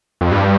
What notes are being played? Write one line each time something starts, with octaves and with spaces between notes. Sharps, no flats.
F2
G2